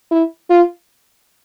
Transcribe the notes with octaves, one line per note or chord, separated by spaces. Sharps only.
E4
F4